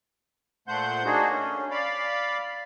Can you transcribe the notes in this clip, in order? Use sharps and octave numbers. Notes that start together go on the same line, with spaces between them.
A#2 A3 C5 F#5 G6
A#3 D4 D#4 F#4 G#4
C#4
D5 F5 B5